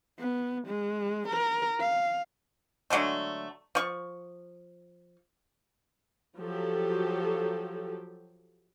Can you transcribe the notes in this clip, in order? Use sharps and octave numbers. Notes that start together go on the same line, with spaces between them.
B3
G#3
A#4
F5
D3 F#3 G#3 A3
F3 C#6
F3 F#3 G4 A4